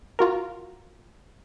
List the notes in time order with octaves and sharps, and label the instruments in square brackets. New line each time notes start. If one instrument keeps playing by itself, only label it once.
[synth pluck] F4 F#4 A#4